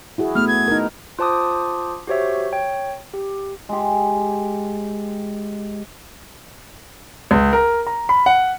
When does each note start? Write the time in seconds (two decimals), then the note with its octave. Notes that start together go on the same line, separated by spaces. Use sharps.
0.18 E4 F#4 G#4
0.35 A3 B3 F6
0.48 G#6
0.68 D#4 A#4
1.19 F4 C5 A5 D6 D#6
2.07 F#4 G4 C5 C#5 E5
2.52 C#5 G5
3.14 G4
3.69 G#3 G4
7.31 C#2
7.53 A#4
7.87 A#5
8.09 B5
8.26 F#5